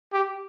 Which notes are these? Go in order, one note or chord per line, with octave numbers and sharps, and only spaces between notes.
G4